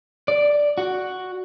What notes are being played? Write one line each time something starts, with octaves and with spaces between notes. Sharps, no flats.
D5
F#4